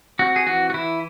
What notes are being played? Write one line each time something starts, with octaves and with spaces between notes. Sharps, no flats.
C4 F#4
G#4
E3 F#4
F#4
E3 E4